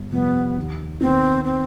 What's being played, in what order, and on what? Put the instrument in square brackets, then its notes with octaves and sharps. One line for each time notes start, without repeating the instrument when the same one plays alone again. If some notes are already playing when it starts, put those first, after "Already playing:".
Already playing: [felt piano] G1
[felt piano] F2 C3 G3 [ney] B3
[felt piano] D#2
[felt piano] D#3 B3 D#4 [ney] C4
[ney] C4